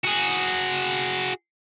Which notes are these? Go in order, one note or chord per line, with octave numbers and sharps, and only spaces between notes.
F#4 G#4